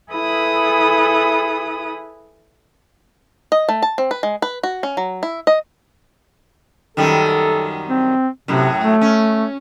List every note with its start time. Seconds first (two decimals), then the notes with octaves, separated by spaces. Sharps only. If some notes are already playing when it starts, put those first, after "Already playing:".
0.12 E4 G#4 A4 B4 D#6
3.52 D#5
3.69 A3
3.82 A5
3.98 C4
4.11 B4
4.23 G#3
4.42 B4
4.63 F#4
4.83 C#4
4.97 F#3
5.23 E4
5.47 D#5
6.97 F#2 D#3 G3 A4
7.89 C4
8.48 F#2 A2 C3 F#3
8.79 A3
9.01 C#4